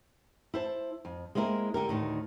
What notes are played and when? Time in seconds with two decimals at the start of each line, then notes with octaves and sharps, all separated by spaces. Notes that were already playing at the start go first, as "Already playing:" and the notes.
0.54 E4 C5 A5
1.05 F2
1.35 G#3 A#3 C4 E4 A#4
1.74 D3 G4 A#4
1.89 D2 A2 D#3